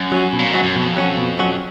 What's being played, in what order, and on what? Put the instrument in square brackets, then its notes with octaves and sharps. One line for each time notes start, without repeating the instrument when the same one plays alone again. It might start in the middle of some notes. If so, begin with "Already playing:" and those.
Already playing: [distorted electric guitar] F#2
[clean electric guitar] F#3 C#4 F#4
B2
[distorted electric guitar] A#2
[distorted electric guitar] G#2 [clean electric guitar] F#3 C#4 F#4
[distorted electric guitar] F#2
[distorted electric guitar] F2 [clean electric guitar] B2
[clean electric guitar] F#3 C#4 F#4
B2
F#3 C#4 F#4